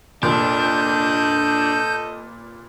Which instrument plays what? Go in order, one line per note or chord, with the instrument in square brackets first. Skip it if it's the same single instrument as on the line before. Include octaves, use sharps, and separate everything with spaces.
[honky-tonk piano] F1 A#2 [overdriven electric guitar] D4 [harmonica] A4 D#5 [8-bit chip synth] G6